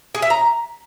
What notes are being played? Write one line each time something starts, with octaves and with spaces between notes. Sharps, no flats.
G#4
E5
A#5